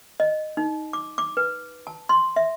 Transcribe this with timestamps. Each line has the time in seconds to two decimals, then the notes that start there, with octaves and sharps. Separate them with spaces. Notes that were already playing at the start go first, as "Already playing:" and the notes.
0.20 D#5
0.57 D#4
0.93 D6
1.18 D6
1.37 B4
1.87 A5
2.09 C6
2.36 E5